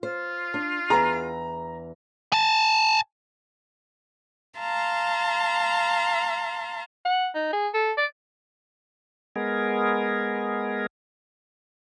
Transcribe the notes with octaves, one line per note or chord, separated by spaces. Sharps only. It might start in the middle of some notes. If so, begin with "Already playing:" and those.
F4 C5
D4
E2 B3 G#4 A#5
G#5 A5
F5 A5 A#5 C6
F#5
D#4
G#4
A4
D5
G#3 B3 G#4 A#4